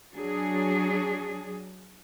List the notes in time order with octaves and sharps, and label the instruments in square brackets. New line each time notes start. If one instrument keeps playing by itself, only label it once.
[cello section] F#3 D4 G#4